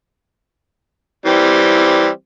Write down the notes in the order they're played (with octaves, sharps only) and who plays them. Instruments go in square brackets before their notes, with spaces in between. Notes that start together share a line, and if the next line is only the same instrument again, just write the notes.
[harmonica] E3 G3 C4